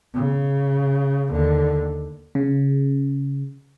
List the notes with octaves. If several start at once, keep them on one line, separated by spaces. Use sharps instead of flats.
C#3
D#2 D3
C#3